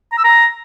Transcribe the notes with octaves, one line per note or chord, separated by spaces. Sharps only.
A#5
E6
A#5